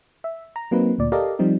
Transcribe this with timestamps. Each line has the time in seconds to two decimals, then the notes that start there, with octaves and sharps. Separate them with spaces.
0.24 E5
0.56 A#5
0.71 F#3 A#3 C4 D#4 B4
0.98 D2 A#2 D5
1.12 G4 A4 A#4 D5 D#5 F5
1.39 F3 G3 C4 D#4